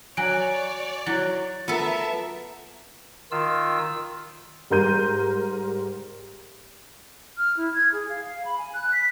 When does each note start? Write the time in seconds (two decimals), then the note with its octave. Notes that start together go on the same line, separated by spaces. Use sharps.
0.17 F#3 C#5 D5 G#5 D7
1.06 F#3 E4 A6
1.68 B3 F4 A4 A#4 E5 A5
3.31 D#3 F4 E6
4.70 G#2 G3 A#4 C6 G6 D#7
7.38 F6
7.57 E4
7.74 G#6
7.93 G#4
8.09 F5
8.25 F5
8.45 B5
8.58 G#5
8.74 F#6
8.92 B6